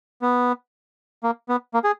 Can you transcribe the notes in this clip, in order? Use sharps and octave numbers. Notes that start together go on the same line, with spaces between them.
B3
A#3
B3
A#3
G#4